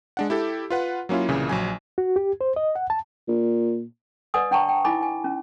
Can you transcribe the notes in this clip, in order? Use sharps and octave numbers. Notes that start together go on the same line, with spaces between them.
G#3 D4 F#5
E4 G4 A4
F4 B4 F#5
F#3 A#3 C#4 E4 F4
C2 A#2 C#3 E3
A#1 F#3 G#5
F#4
G4
C5
D#5
F#5
A5
A#2
B4 D5 D#5 F#5 G#5 D#6
D4 F#5 G5 A5 A#5 C#6
G5
D#4 E4 D#5 G#5 B5 D6
G#5
C#4